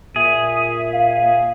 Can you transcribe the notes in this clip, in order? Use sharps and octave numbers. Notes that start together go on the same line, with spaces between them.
A#2 G#4 E5
F5